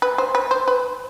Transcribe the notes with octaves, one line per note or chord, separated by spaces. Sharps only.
B4
C5
B4
C5
B4